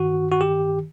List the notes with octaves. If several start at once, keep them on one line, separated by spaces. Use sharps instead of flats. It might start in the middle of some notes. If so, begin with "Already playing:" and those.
Already playing: G2 D#3 F#4
F#4
G4